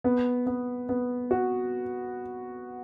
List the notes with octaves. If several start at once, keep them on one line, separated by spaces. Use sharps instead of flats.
B3
B3
B3
F#4